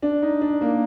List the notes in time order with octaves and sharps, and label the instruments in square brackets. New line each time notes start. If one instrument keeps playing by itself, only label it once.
[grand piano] D4
D#4
D4
A#3